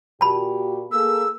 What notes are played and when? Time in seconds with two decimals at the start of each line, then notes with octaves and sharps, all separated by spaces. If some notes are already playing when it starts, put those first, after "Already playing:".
0.21 A#2 F#4 G4 A5 B5
0.92 A#3 G#4 A4 E6